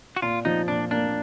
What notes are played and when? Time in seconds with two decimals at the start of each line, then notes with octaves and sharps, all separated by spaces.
0.16 F#4
0.22 A#2 F4
0.45 F3 D#4
0.68 A#2 D4
0.91 A#3 D4